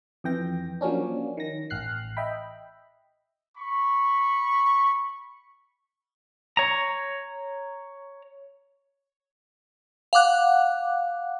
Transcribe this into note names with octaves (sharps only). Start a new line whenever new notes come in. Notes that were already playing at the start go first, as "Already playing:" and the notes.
F2 E3 G5 A#6
F3 F#3 A#3 C#4 D4
D#3 A#6
A1 F6 F#6 C7
D#5 E5 G5 B5
B5 C#6
C#5 A#5
F5 F#5 D6 F#6